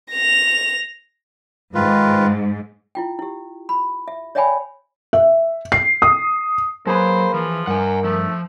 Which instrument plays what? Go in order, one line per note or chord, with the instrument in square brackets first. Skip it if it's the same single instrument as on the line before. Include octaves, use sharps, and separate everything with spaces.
[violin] A#6 F7
[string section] G#2 [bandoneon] D#3 F4 B4
[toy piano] E4 F4 G5
E4 G4
B5
E5
C#5 D5 E5 G5 G#5 B5
[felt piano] E5
C7
D#6
[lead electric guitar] F#3 [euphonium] A#3 [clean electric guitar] G#4 B4 [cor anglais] C5
[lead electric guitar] E3 [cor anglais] F3
[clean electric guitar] G2 [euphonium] A#4 [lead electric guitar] F#5 G#5
[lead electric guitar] F3 [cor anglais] A3